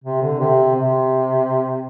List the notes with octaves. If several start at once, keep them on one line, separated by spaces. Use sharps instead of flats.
C3
D3
C3
C3